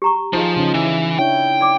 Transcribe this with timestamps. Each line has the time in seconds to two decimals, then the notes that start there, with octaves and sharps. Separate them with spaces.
0.02 G4 A#5 C#6
0.33 F3 D#4 F4 G#4 C5 D#5
0.57 C#3 C#4 D#4
0.74 E3 E4
1.19 D4 E4 C#5 G5
1.61 D5 D6